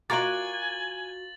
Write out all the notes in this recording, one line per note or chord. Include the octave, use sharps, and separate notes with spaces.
F4 F#4 A#4 D5 G#5 D6 A6 F#7